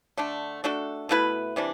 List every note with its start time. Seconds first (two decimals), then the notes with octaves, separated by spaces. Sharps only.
0.17 D3 A3 D4
0.64 A3 D4 F#4 A4
1.09 B2 A3 E4 B4
1.56 C3 E3 G3 D4